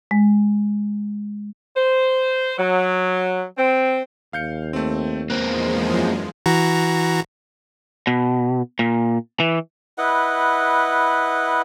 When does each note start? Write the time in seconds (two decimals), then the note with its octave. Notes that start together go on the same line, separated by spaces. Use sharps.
0.11 G#3
1.76 C5
2.57 F#3
3.57 C4
4.33 D#2 F5 G6 C#7
4.73 A3 C4
5.30 E2 F3 G#3 A#3 C4 F#6
5.89 F#2
6.46 E3 F#4 A#5
8.07 B2
8.79 A#2
9.40 E3
9.98 E4 B4 D#5 F#5